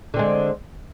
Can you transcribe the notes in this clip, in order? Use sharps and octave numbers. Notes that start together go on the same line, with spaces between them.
D3 G#3 C4